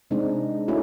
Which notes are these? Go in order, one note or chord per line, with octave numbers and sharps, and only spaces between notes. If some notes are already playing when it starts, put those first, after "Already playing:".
C3 G#3 C4 D4 D#4
A3 C#4 D#4 E4 F#4